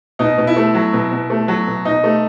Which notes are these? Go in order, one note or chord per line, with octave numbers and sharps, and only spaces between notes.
B2 D#4
B2
E4
A3
F#3
B2
B2
A3
F#3
B2
B2 D#4
A3